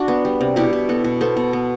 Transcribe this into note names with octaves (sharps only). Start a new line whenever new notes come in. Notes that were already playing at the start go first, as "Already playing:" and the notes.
Already playing: D4 F#4
B3
G3
C3
B2 E4 G4
B2
B3 F#4 A4
B2
B3 A4 C5
B2
B3